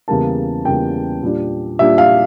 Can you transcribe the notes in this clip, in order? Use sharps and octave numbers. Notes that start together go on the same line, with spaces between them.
E2 C#3 G3 A#3 A5
E2 C#3 G3 A#3 G5
A#2 G3 D4
A#2 G3 D4 E5
F5